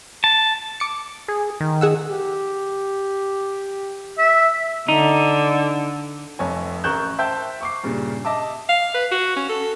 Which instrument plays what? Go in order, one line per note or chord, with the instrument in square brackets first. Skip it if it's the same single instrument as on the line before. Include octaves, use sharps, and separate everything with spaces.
[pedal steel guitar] A5
[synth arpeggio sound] D6 C#7
[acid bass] G#4
D#3
[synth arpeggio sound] G#4 F#5 E6
[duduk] G4
[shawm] E5
[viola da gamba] D3 [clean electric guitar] D#4
[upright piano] F1 F2 C#5 G#5
A1 A#4 C#6 F#6 G6 E7
C5 E5 G5 A5 G6
C#6 D6 C7
G2 A#2 C#3
D#5 E5 A5 D6
[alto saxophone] F5
B4
F#4
C#4
A4